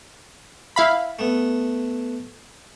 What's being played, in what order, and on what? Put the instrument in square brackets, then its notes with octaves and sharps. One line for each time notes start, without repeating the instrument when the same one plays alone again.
[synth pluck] E4 F5 B5
[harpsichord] A3 B3